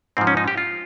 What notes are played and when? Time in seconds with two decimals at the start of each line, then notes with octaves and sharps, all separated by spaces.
0.17 G#2 F3 C4
0.27 C#4
0.37 D#4
0.48 G4
0.57 F4